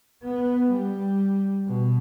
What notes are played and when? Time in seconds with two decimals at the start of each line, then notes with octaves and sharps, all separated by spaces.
0.24 B3
0.71 G3
1.67 B2